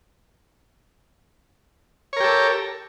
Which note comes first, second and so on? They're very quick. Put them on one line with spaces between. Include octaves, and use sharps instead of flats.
C#5 A#4 G4 A4